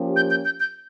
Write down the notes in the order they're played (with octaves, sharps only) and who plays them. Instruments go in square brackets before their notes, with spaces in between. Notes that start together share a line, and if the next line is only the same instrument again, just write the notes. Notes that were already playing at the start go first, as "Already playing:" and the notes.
Already playing: [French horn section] F3 A#3 C#4 G4
[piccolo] G6
G6
G6
G6